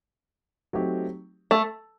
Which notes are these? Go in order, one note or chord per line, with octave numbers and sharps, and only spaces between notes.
F#3 A3 C4 D#4 G4
A3